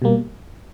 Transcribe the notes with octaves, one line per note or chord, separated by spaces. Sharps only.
B2 G3 A#3